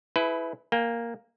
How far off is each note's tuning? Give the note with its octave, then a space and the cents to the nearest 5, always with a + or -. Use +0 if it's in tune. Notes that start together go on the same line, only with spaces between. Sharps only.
E4 +0 G#4 +45 B4 +20
A#3 +0 G5 +35